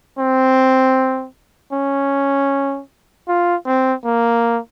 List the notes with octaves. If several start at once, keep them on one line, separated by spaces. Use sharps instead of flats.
C4
C#4
F4
C4
A#3